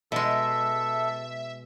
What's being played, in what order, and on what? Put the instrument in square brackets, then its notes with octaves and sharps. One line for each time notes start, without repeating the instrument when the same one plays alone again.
[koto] B2 G#3 [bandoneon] A4 [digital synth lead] E5